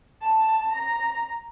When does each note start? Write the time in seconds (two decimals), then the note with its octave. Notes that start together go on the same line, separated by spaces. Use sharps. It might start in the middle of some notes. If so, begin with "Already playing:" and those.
0.20 A5
0.70 A#5